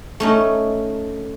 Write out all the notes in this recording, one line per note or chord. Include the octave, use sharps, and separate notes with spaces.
A3 C#4 D#4